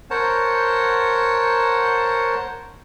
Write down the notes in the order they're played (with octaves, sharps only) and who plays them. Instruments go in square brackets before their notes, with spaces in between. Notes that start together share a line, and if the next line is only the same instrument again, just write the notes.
[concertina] A#4 C5 C#5 F#5 A5